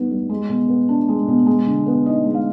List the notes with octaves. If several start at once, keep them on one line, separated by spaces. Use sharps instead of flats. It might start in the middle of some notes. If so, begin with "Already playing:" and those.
Already playing: G3 B3 D#4
G3
G#3
B2
B3
D4
G#3
B2
G#3
D3
B3
D#4 D#5
G#3
F5